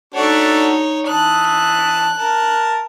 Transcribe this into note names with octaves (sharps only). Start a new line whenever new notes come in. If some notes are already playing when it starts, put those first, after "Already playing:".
A3 D4 D#4 F#4 C#5
E3 A5 D#6 F#6
A#4 A5